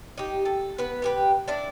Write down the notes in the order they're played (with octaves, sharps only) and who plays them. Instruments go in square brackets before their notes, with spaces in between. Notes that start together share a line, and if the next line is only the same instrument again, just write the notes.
[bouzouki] D#4 G4
A4
B3 B4
G4 G#4 B4
D4 E4 D5